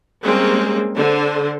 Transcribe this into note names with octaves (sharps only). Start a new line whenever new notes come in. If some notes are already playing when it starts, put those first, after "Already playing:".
G3 G#3 A#3 C4 C#4 G#4
D3 C5